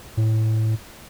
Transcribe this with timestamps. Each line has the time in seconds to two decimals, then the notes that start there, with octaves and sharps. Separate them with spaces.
0.17 A2